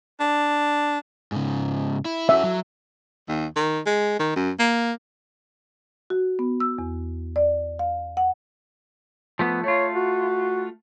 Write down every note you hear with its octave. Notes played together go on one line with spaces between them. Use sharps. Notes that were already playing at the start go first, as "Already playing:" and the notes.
D4
G#2 C#3
E4
C#4 F#4 E5
F#3
D#2
D#3
G#3
D#3
F#2
A#3
F#4
B3
E6
E2
D5
F5
F#5
F3 A3 B3
A3 F4 C#5
F#4